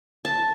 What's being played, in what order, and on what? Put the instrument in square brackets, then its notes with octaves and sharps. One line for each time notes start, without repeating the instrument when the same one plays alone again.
[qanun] A5